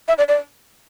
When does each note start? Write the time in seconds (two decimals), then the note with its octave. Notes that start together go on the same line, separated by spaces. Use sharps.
0.08 E5
0.18 D5
0.28 D5